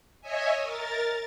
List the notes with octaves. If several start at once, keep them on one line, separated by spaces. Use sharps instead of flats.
C#5 D#5 E5 G#5
A#4 A6